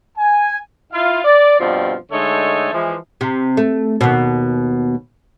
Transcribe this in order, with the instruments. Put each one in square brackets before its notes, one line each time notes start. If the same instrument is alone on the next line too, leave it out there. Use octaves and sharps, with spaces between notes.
[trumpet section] G#5
[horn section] E4 F4 F5
D5
G2 B2 F3 C4 F4 D5
D3 G#3 A3 D#4 A4 C#5
E3 F3 G#3
[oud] C3
A3
D#2 B2